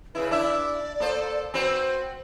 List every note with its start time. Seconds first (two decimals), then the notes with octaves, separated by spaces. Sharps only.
0.15 C#3 E4 B4
0.31 D4 E4 D5 E5
1.00 A#3 A4 C5
1.54 C4 F#4 B4 C5